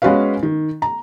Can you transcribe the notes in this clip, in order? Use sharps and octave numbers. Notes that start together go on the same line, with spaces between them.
G#3 B3 C#4 F#4 B4 F5
D#3
A#5